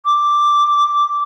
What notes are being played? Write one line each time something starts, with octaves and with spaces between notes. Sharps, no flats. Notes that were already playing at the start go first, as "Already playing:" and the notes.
D6